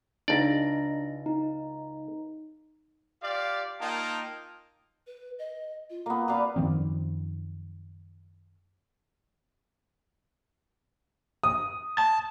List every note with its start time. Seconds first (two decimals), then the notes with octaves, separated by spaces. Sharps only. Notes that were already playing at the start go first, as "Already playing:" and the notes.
0.28 C#2 D4 D#4 D5 A#6
1.26 D#4
3.22 F4 G4 D5 F5
3.80 A#3 D#4 F4 G5 A5
5.07 B4
5.39 D#5
5.90 F4
6.06 A#3 B3
6.28 B4 D5 F5 A#5
6.56 F#2 D#3 F3 C4
11.44 D#6
11.98 A5